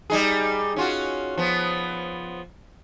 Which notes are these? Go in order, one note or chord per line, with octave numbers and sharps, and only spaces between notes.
G3 D#4 G#4
C#4 F4 F#4
F3 B3